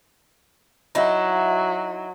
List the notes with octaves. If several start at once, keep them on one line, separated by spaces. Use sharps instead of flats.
F#3 D#4 E4